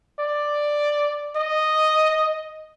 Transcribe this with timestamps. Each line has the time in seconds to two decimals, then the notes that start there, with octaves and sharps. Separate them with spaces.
0.20 D5
1.37 D#5